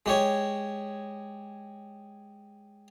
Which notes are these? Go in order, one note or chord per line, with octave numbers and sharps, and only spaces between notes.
G#3 G4 C#5